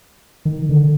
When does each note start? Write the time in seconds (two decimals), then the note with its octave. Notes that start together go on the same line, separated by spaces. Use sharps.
0.45 D#3
0.69 D3